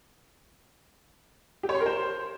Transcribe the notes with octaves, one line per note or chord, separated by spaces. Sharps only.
G4
C#5
C6
A#4
C5